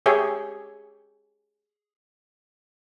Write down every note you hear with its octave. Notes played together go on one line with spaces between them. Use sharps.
G4 G#4 C#5 E5